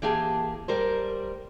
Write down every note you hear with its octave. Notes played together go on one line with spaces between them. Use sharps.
E3 A#3 G4 G#4 A5
G3 A#4 C5